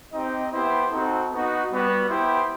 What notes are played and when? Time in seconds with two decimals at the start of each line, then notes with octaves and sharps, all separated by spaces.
0.12 C4 D#4 G4 D#5
0.52 B3 E4 G4 C5
0.91 C4 D#4 F#4 A4
1.31 B3 D#4 F#4
1.71 G3 B3 F#4
2.10 B3 E4 G4 C5